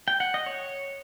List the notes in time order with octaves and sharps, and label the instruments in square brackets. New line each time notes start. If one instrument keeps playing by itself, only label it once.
[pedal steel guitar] G5
F#5
D#5
C#5